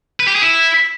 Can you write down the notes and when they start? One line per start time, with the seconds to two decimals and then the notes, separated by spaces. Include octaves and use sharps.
0.20 B4
0.27 G4
0.35 G#4
0.43 E4